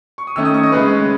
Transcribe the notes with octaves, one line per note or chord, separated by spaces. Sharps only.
C#6
D#6
D#3 A3 C#4 E6
D#6
C#6
D#5
C#3 G#3 C#4 B4